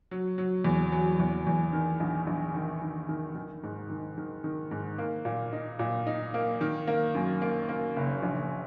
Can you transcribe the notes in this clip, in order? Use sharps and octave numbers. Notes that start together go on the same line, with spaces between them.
F#3
F#3
E2
F#3
E2
E2
D#3
A#1
A#1
D#3
D#3
D#3
D#3
G#2
D#3
D#3
D#3
G#2
A#3
A#2
D#4
A#2
D#4
A#3
D#3
A#3
F#2
A#3
A#3
F#1
A#1